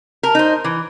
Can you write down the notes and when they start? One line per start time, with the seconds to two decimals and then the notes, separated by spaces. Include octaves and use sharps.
0.23 A#4
0.35 D#4 C5
0.64 E3